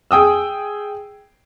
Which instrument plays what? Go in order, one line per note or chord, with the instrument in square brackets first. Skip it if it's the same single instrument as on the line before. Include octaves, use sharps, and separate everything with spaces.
[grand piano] G#4 G5 D#6 E6